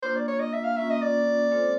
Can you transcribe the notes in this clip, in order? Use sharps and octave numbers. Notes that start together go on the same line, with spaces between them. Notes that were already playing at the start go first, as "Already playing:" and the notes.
A#3 D4 F4 C5
D5
C#5
D#5
E5
F5
A#3 C#4 F4 E5
D#5
D5
G#3 C4 F4 A4 C5